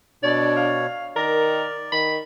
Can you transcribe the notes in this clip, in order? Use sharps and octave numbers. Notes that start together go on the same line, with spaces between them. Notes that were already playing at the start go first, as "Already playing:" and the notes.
B2 D4 C#5 D5
F5
D#3 A#4 D5
D#3 B5